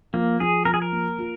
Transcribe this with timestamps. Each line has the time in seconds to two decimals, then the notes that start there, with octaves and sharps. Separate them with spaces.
0.14 F3 A#3
0.40 F3 G#4
0.65 F3 A#4
0.74 G#4
0.82 A#4
0.92 A#3
1.18 F4